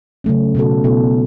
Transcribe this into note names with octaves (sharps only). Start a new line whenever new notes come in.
C#3 F#3 A3 C#4
B2 B3 F#4 A4
B2 B3 E4 A4